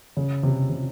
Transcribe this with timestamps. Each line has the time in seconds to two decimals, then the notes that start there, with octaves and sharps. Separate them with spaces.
0.17 C#3
0.43 C3
0.70 C3